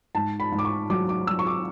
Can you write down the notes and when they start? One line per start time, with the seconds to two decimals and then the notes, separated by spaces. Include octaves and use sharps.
0.15 G#2 A5
0.40 B5
0.52 G#2
0.59 D6
0.65 C#6
0.90 F#3 D6
1.09 D6
1.27 F#3 E6
1.39 C#6
1.47 D6